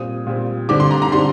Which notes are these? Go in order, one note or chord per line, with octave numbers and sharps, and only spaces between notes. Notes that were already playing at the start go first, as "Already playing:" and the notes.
Already playing: A#2 G3 C4 D#6
A#2 G3 C4
D3 G3 C4 D6
C6
A#5
A#5
D3 G3 C4 C6